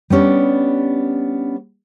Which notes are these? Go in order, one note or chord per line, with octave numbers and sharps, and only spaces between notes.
G3 B3 C#4 D4